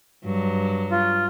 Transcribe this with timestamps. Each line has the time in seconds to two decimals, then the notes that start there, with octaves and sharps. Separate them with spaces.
0.24 G2 F#3
0.91 F4